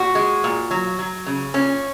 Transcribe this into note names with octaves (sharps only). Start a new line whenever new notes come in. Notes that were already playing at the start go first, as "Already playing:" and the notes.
Already playing: A#2 F#4
G#3
A#2
F#3
F#3
C#3
A#2 C#4